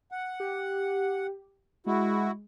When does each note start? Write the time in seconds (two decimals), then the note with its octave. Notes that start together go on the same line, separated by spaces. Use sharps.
0.12 F#5
0.40 G4
1.86 G#3 E4 F#4